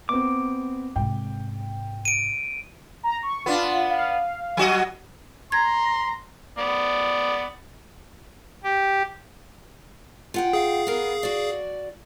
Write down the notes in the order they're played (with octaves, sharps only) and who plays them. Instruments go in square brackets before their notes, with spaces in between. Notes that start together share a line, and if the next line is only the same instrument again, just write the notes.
[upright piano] B3 C4 [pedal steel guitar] D6
[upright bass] G#2 C3 [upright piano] G5
[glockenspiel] D7 D#7
[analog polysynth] A#5
C#6
[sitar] B3 D4 [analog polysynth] F4
[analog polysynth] F5
[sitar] F#3 F#4 D#5
[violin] A#5 [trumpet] C6 [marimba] G#6
[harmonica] B3 D5
[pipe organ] G4
[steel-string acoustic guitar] F4 F#5 G5
[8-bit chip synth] G#4 F5
[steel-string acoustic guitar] B3 A#4
F#4 D5